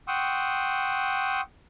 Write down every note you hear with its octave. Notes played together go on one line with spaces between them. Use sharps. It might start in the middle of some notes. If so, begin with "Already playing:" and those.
F#5 G5 C6 C#6 D#6 E6